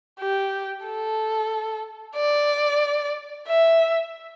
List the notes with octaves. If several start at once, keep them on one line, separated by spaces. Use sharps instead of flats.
G4
A4
D5
E5